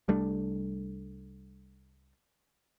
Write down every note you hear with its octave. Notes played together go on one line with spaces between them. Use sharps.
C2 G3 A3 D4